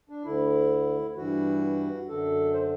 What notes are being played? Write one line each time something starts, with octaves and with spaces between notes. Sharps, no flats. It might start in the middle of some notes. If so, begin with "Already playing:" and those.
D4
D2 D3 E4
G2 E3 F#4
F#2 D3 A4
C5